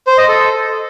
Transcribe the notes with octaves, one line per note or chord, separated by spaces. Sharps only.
C5
D#5
A4